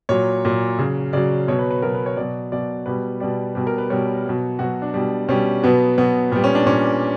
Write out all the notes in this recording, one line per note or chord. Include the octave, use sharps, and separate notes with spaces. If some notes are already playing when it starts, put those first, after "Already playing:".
A#2 F#3 C#5
A#2 F#3
C#3 F#3
C#3 F#3 D5
B2 F#3 C#5
B4
B4
B2 F#3 A#4
B4
C#5
B2 F#3 D5
B2 F#3 D5
B2 G3 B4
B2 G3 D5
B2 G3 B4
A#4
B4
B2 G3 C#5
B2 F#3
B2 F#3 F#4
D4
B2 G3
B2 G3 C#4
B2 F#3 B3
B2 F#3 B3
A#2 G3 B3
C#4
D4
A#2 C#4